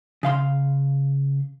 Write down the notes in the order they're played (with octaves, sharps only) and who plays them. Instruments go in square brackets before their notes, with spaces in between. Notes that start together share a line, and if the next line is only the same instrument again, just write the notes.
[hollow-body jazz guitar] C#3 F5 C6